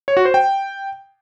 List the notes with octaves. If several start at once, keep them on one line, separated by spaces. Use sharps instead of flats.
C#5
F#4
C5
G5